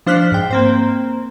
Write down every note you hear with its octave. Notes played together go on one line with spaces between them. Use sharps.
F3 D4 C5 F6 F#6 B6
G#2 G5
A#3 C4 C5